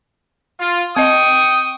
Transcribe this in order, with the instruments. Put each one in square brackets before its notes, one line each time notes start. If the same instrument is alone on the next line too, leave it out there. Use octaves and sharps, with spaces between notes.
[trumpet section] F4
[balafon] C4 D#5 [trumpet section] G5 C#6 D#6